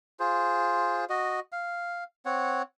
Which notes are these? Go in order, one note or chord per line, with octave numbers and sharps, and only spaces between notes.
F4 G#4 C5
F#4 D#5
F5
C4 C#5 F#5